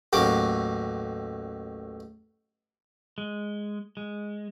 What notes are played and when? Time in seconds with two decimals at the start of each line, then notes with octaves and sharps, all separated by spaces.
0.13 A1 D#2 F#3 D6
3.18 G#3
3.97 G#3